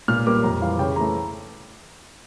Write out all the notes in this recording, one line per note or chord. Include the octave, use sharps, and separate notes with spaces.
A#2 F6
G3 A#3 D6
F2 A#5
E3 G3 F5
C#3 G5
E3 A3 A#5